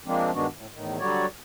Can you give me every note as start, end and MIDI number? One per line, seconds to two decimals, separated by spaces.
0.06 0.31 53
0.06 0.31 56
0.06 0.31 58
0.06 0.31 60
0.06 0.31 62
0.34 0.47 43
0.34 0.47 51
0.34 0.47 56
0.34 0.47 59
0.34 0.47 62
0.34 0.47 66
0.54 0.67 45
0.73 0.98 40
0.73 0.98 45
0.73 0.98 51
0.99 1.26 50
0.99 1.26 54
0.99 1.26 55
0.99 1.26 66
0.99 1.26 73
0.99 1.26 74